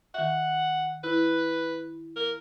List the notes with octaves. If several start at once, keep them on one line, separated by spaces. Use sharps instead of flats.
D#3 E5 F#5
E4 B4
A#4